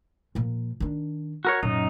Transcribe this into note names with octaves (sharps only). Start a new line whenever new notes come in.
A#2 F3
D#3 D4
F#4 A#4 C#5
F#2 A#2 D#4